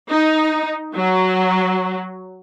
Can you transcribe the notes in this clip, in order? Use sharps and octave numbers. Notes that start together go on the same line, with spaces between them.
D#4
F#3